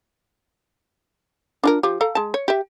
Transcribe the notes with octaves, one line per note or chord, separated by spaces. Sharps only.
D4 F4 A#4
F3 F4 G4
A4 F5 A#5
G#3 A5
C#5
G4 E5